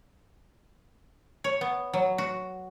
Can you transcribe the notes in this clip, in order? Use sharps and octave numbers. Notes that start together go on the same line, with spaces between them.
C#5
B3
F#3
F#4